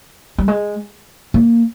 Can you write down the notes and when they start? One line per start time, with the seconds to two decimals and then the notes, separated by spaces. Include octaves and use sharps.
0.38 G3
0.48 G#3
1.34 A#3